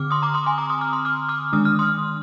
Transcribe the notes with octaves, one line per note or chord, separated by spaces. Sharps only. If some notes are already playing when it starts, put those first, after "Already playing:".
Already playing: D3 C4 D6 F6
C6 D#6
A#5 D6
C6 D#6
G#5 C6
A#5 D6
C6 D#6
D6 F6
C6 D#6
D6 F6
D6 F6
D#3 G#3 D4 D#6
F6
C6 D#6